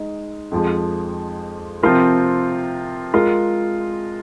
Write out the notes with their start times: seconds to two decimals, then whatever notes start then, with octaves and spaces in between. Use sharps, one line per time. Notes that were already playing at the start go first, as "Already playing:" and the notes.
Already playing: G#3 D#4
0.51 F2 F3 G#3
1.83 C3 F3 C4 F4 A#4
3.14 G#3 F4 A#4